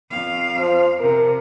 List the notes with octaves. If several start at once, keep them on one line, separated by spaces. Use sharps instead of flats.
F2 F5
F3
C3 A#4